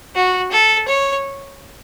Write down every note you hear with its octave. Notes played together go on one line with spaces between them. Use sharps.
F#4
A4
C#5